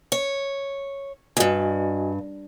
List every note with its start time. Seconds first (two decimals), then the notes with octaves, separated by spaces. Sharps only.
0.12 C#5
1.37 E2 G2 F#4 D#5 G#5